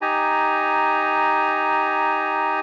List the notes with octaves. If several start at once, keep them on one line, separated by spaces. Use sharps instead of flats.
D#4 G4 G#5 A#5